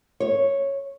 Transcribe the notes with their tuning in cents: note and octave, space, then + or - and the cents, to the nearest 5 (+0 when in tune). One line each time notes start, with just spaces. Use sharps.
C#5 -5